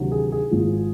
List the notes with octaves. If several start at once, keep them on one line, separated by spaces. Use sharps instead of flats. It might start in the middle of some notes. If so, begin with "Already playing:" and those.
Already playing: D2 C3 D#3 F#3
G#4
G#4
G#1 G#2 F3